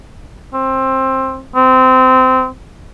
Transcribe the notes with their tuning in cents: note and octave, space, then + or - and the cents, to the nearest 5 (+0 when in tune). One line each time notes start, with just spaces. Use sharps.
C4 +20
C4 -20